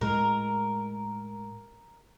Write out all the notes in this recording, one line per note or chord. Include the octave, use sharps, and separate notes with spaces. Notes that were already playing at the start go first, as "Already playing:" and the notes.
A2 G#3 A#4